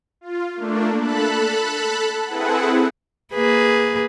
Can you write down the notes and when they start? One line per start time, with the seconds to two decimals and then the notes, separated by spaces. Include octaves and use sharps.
0.21 F4
0.55 A3 A#3 D4
1.00 A4 A5 B5 F#6
2.27 C4 E4 G#4 A4 B4 F#5
3.33 A#3 G#4 B4